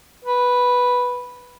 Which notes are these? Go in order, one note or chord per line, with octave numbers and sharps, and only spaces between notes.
B4